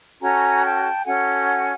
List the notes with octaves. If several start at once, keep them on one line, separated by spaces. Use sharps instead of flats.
C#4 F#4 A4 G#5 A#5
G5 A5
C#4 F#4 A4 F#5 G#5